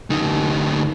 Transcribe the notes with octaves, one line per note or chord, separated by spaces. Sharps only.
D2 D#4